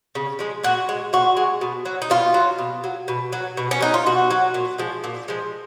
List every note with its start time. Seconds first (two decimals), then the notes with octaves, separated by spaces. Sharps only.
0.15 C#3
0.39 F3 G#3
0.63 A#2 F#4
0.89 G#3
1.13 A#2 F#4
1.37 G#3
1.61 B2
1.85 F#3
2.02 D#4
2.10 B2 F4
2.34 F#3
2.58 B2
2.84 F#3
3.08 B2
3.33 F#3
3.57 B2
3.71 C#4
3.81 F#3 D#4
3.94 F4
4.06 B2 F#4
4.31 F#3
4.54 A#2
4.78 F3 G#3
5.04 A#2
5.28 F3 G#3